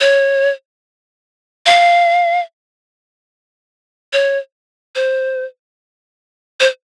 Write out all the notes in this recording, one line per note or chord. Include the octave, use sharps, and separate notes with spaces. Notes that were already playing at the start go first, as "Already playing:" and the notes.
C#5
F5
C#5
C5
C5